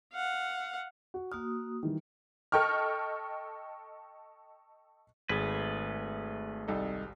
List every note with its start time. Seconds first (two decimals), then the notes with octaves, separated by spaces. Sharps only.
0.13 F5 F#5
1.14 F#4
1.32 A#3 F#4 D#6 F6
1.83 D#3 E3 G3
2.52 A4 D#5 G5 C#6 F6
5.29 G#1 A3 G#4 B4
6.68 C2 D#4 A4